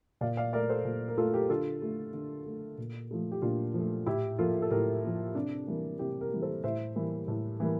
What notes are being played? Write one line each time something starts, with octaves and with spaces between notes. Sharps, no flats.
A#2 D5 F5
D5 F5
A3 A#4 D5
A4 C5
A#2
A#4
A3 F4 A4
G4 A#4
D3 F4 A4
A3
D3
A3
A#2
F3 A3
G4
A#2 D4 F4
F3 A3
A2 E4 G4
F3 A#3 F4 A4
A4
A2 G4 A#4
F3 A#3
C3 D4
E3 G3 A#3
C3 E4 G4
G4 A#4
E3 G3 A#3
A4 C5
A2 C5 E5
E3 G3 A#3
A2
E3 G3 A#3